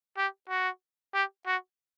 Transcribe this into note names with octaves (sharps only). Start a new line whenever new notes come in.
G4
F#4
G4
F#4